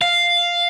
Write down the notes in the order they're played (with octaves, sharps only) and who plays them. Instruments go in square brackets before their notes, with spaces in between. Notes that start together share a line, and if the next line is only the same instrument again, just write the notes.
[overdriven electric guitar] F5